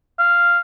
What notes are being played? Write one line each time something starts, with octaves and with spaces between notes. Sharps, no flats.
F5